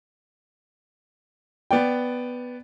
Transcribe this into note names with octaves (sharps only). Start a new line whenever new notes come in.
B3 D5 G5